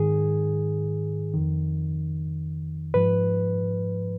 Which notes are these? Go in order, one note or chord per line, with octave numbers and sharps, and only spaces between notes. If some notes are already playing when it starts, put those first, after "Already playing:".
Already playing: G#2 D#3 G#4
F2 D#3
G#2 F3 B4